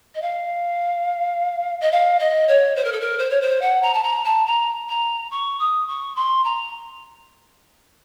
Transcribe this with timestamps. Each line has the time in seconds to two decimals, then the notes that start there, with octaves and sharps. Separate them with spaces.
0.14 D#5
0.21 F5
1.80 D#5
1.92 F5
2.19 D#5
2.48 C#5
2.76 C5
2.84 A#4
2.92 A4
3.00 A#4
3.18 C5
3.30 C#5
3.41 C5
3.61 F#5
3.82 A#5
3.93 A5
4.03 A#5
4.24 A5
4.46 A#5
4.89 A#5
5.31 C#6
5.59 D#6
5.88 C#6
6.16 C6
6.44 A#5